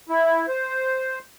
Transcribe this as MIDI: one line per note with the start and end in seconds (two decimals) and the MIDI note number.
0.09 0.46 64
0.48 1.19 72